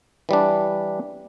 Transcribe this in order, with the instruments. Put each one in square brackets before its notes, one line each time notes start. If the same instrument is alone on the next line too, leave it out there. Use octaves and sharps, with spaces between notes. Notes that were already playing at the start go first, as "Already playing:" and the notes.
[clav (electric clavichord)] E3 G3 D4